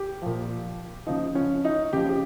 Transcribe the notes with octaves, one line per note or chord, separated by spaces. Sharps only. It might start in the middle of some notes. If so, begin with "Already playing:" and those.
Already playing: G4
A#2 F3
C#3 F3 D#4
C#4
D#4
C#3 F3 G4
G4